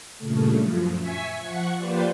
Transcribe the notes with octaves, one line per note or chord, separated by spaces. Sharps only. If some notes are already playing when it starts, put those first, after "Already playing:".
G2 A#2 C#3 A3
F#2 F3
E5 G#5 C#6 B6
F3 F#5 C#6
F3 A#3 G4 B4 C5 D5